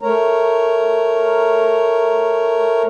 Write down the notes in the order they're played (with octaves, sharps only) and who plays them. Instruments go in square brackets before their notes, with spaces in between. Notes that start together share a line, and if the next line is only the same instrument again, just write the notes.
[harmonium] A3 A#4 C#5 A#5